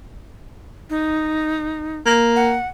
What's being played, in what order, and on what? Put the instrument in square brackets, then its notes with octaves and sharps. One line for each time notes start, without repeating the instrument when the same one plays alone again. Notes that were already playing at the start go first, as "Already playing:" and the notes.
[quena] D#4
[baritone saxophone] A#3
[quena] F#5